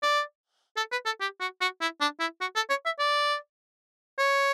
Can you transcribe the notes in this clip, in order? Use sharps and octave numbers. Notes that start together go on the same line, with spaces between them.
D5
A4
B4
A4
G4
F#4
F#4
E4
D4
E4
F#4
A4
C#5
E5
D5
C#5